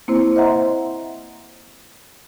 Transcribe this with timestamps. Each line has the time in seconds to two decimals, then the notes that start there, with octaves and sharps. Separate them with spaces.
0.08 A#3 C4 E4 C5
0.36 C5 D#5 E5 F#5 A#5 C6